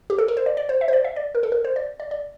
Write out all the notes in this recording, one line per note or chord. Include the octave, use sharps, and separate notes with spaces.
G4
A4
A#4
C5
D5
D5
C5
E5
C5
D5
E5
D5
A#4
A4
A#4
C5
D5
D5
D5